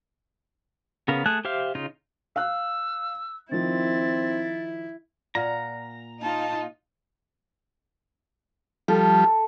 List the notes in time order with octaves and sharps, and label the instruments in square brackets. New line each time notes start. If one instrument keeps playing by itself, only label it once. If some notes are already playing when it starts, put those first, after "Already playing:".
[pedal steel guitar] C#3 B3 A#4 F5
A3 G#4 A5 F#6
G4 C5 E5 F5 F6
C#3 D#4 F4
[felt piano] F5 F#6 [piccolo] E6
[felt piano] D#3 F3 [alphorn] C4 [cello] E4 [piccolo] A6
[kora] A#2 A#4 F#5 [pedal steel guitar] A#5
[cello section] A#3 D#4 F4 [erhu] A5
[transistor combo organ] F3 G3 [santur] A4